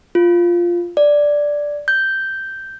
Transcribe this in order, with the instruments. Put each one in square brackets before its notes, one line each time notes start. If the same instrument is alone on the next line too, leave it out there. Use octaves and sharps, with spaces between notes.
[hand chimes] F4
D5
G6